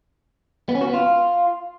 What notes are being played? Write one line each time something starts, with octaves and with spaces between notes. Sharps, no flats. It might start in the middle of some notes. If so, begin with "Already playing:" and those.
B3
C#4
F#4
B3
F4